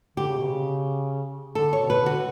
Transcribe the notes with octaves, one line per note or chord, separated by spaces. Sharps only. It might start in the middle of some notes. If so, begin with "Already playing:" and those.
D3 G4
C#3
B2
C#3
D3 A4
C#5
B2
B4
D3
F#4